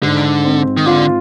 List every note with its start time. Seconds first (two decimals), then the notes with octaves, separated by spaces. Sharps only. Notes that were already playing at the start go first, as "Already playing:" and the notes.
0.03 G#2 D3
0.45 C4
0.77 D#3
0.86 D3 F4